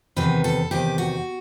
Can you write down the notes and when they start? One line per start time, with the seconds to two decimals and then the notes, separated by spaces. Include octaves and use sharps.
0.17 E2 C3 D#3 B4
0.44 A4
0.71 E2 C3 D#3 G4
0.98 F#4